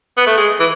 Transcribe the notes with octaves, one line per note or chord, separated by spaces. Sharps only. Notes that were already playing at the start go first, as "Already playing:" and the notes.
B3
A3
G#3
E3